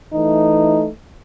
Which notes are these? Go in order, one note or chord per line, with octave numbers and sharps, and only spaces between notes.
E3 A3 D#4